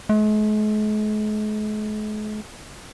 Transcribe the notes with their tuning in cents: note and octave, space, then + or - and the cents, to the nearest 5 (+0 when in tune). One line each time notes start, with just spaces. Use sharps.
G#3 +45